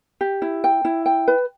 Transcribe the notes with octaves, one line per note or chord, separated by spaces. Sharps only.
G4
E4
G5
E4
G5
B4